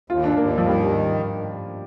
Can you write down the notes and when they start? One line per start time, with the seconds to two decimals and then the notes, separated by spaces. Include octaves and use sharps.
0.10 D#2 F4
0.24 D4
0.37 D#2 A#3
0.58 F3
0.66 D#3 G3